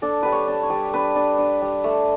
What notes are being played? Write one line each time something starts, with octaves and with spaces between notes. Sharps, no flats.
D4 A4
G3 B4
C#5
D4
C#5
G3
D4 B4
D4
D4
G3
A3